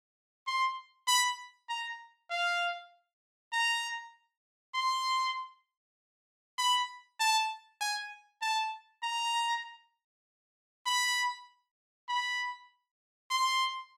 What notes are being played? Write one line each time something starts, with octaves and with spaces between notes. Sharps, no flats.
C6
B5
A#5
F5
A#5
C6
B5
A5
G#5
A5
A#5
B5
B5
C6